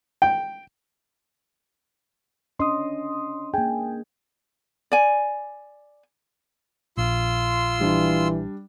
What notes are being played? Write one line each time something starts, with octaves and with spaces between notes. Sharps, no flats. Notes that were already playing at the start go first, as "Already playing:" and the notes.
G5
C#4 D4 D#5 C6 D#6
A#3 G#4 G5 G#5
D5 G#5
A#1 F4 C6 E6
E3 G3 D4